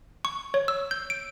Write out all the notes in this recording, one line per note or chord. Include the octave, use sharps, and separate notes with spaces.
C#6
C#5
E6
G6
D7